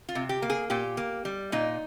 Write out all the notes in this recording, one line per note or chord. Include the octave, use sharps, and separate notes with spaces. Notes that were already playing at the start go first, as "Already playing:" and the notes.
F4
C3
G4
A#3
G#4
A#2 G4
A#3
G3
A#2 D#4